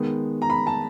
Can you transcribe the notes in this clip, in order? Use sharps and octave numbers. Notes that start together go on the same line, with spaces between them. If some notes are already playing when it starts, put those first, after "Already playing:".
Already playing: D#3 G#3 B3
A#5
B5
A5